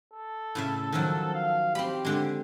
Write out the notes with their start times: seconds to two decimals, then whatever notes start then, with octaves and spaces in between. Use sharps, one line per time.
0.13 A4
0.55 A2 C#3 E5
0.92 D#3 F3 F#3
1.35 F5
1.75 C4 G4 B5
2.05 D3 G#3